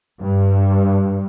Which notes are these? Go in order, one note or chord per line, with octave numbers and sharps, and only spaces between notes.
G2